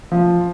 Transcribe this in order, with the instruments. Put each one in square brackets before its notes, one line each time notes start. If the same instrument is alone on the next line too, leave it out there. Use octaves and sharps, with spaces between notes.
[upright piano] F3